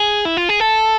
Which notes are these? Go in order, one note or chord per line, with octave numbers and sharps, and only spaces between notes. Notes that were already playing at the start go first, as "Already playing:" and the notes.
Already playing: G#4
E4
F4
G#4
A4